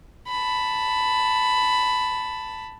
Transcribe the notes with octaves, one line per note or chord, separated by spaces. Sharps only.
A5 B5